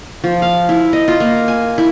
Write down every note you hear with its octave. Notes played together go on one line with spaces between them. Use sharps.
F3
F5
E4
D#5
F4
A#3
G#5
E4